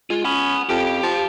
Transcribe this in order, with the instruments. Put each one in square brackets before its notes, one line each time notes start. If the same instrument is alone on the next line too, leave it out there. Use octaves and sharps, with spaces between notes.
[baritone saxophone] G#3 [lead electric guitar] F4
[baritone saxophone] C#4 [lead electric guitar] F#5 B5
[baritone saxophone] F2 [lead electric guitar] G4
[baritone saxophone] F3